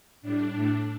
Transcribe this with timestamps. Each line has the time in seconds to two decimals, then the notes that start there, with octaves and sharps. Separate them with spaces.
0.22 A2 G3 D4
0.52 A2 A3